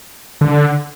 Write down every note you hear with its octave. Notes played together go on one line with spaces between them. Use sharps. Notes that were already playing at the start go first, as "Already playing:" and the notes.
D3